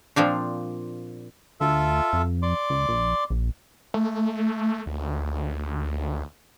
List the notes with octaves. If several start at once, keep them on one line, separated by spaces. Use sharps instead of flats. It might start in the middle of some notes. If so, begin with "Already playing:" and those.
A#2 F3 C4 D4
D2 F4 A4 E5
F2
D5 C6 D6
C#2
A#1
A#1
A3
D2